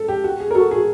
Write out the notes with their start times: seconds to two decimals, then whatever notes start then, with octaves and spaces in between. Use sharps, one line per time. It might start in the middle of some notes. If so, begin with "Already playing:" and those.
Already playing: A4
0.08 G4
0.24 F#4
0.40 G#4
0.51 A#4
0.55 F#4 A4
0.71 G#4